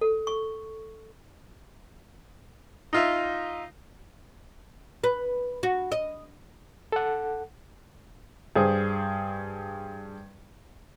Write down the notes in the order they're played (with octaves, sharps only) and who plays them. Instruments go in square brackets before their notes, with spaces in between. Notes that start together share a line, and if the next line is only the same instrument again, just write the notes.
[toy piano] A4
C#6
[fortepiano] D#4 F4 E5
[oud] B4
F#4
D#5
[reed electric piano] A4 F#5
[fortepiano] G2 G#4 C5